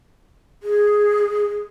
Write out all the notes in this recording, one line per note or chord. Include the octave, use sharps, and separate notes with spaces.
G#4